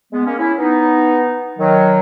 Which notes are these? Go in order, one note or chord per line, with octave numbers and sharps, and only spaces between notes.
G#3 B3
A#3 C#4
C#4 E4
B3 D#4
D#3 F#3